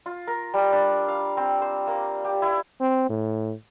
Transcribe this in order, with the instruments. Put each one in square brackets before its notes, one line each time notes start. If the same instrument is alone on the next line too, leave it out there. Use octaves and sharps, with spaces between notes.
[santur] F4
A#4
G3
D4
F5
C4
C5
A#3
G4
E4
[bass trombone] C4
A2